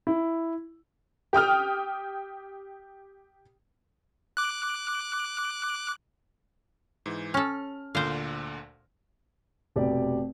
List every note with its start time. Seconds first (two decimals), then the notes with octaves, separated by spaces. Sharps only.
0.07 E4
1.33 G4 G5 D#6 F6
4.37 D6 F#6
7.06 G#2 E3
7.34 C#4 A4 F6
7.95 D2 A#2 D3 C5 F5
9.76 F1 B2 G4 D5